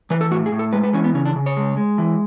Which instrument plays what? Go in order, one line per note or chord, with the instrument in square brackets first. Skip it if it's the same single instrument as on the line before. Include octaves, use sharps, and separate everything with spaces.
[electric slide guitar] E3 B4
A4
A2 F#4
G#4
A2
A4
G#3 B4
B4
E3 C#4
B3
C#3 C#4
D4
C#3
C#5
G#3
G#3
E3